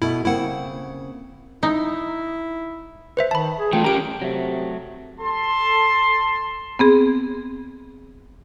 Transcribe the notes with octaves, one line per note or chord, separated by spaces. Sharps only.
B2 A3 E4
C#3 A#3 C4 E4 F#5
D#4 E4
B4 C5 E5
D#3 A5 B5
G#4
E3 A3 F4 G5
C#4 G4 A#4 A#5 D7
C3 F#3 A3
A4 A5 C6
B3 C4 G#4